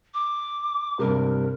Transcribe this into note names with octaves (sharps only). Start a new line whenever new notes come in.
D6
G2 C3 A#4